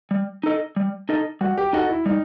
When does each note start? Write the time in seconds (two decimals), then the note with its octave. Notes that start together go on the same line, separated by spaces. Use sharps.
0.11 G3
0.43 D#4 A4 D#5
0.76 G3
1.09 D#4 A4 D#5
1.41 G3 F#4
1.57 G4
1.73 D#4 F#4 A4 D#5
1.89 E4
2.06 G3 D#4